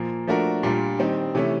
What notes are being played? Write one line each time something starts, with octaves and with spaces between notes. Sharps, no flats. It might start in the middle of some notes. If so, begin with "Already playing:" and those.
Already playing: A#2 F3 A#3
F3 A3 D4 F#4 A#4
A#2 G3 A#3 D4 F4
D#3 G3 C4 D#4
C3 E3 A3 C#4